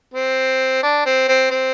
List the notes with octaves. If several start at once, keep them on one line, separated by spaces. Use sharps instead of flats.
C4
D4
C4
C4
C4